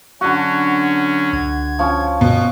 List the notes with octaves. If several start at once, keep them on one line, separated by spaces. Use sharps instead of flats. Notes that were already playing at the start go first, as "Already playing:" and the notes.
D3 F#3 C#4 F#4
C#2 G#6
F3 C#4
B2